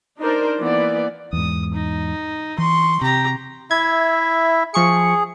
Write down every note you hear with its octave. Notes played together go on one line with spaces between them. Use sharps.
D4 D#4 A#4 C5 D5
E3 A#3 B3 D5
E2 G#2 D#6
D#4
E3 C6 C#6
C3 G4 A#5
E4 E5 G#6
F3 G#4 C#6 C#7